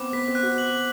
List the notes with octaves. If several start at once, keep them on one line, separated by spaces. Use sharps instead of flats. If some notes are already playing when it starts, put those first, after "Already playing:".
Already playing: B3 C4 D6
B3 B6
C4
F#6
F#4
F#7